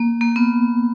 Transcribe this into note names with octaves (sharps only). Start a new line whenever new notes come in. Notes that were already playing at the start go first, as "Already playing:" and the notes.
Already playing: A#3
A#3
B3